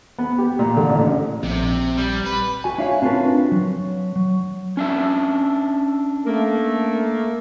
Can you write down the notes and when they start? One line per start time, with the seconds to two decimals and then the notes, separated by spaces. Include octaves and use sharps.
0.18 B3
0.38 G4
0.59 A#2
0.77 D3
0.90 A1
1.43 A#1 C3
1.97 G3
2.25 B4
2.64 F#4 G#5
2.78 D4 E4 F#4 C#5 F5
3.02 C4 D4 F4 F#4 A#4 B4
3.52 F#3
4.16 F#3
4.77 C#4 D4 E5
6.26 A3 A#3